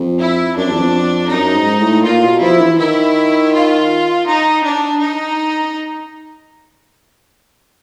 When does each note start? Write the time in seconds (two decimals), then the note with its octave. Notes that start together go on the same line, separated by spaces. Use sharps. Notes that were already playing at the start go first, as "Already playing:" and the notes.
Already playing: F2
0.21 E4
0.57 F#2 D4
0.65 F2
0.72 E2
0.79 F2
1.31 F#2 D#4
1.56 G#2
1.80 A2
2.05 A#2 F4
2.24 B2
2.42 F3 E4
2.61 E3
2.79 D#3 E4
3.53 F4
4.28 D#4
4.64 D4
5.01 D#4